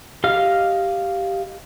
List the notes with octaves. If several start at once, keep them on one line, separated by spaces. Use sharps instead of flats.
G4 D#5 F5 F6